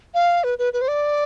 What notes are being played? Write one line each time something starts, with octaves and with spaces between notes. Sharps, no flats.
F5
B4
B4
B4
C5
D5